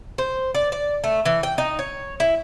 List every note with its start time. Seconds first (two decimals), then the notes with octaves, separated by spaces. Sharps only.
0.18 C5
0.55 D5
0.72 D5
1.04 A3
1.26 E3
1.43 G5
1.58 D#4
1.79 C#5
2.20 E4